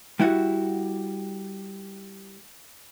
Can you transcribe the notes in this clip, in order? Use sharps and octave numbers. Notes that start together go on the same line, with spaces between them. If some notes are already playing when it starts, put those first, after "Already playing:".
G3 E4 F#4 F#5